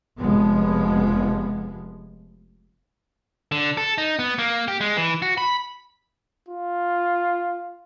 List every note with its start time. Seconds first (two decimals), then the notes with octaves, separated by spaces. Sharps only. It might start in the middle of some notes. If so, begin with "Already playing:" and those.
0.18 F1 F3 G#3 B3
3.52 D3
3.77 A4
3.98 D#4
4.19 B3
4.39 A#3
4.68 G4
4.81 G#3
4.97 E3
5.22 F#4
5.38 B5
6.49 F4